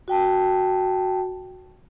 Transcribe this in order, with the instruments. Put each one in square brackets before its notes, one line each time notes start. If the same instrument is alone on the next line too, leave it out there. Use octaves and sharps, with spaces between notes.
[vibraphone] F#4 G5 A5